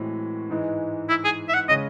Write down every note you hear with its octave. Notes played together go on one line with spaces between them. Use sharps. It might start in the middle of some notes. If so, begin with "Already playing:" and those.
Already playing: A2 E3 G#3 C4 F#4
G#2 E3 G#3
E4
G#4
E5
F#5
C#3 G#3 C#4 D#5